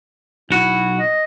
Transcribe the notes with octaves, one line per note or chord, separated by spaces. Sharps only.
B1 E4 F#4
D#5